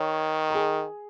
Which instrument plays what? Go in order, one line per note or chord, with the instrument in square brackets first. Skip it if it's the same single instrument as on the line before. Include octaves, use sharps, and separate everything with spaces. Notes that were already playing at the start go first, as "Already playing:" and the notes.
Already playing: [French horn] D#3 [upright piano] C#5
[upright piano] A#4
G#4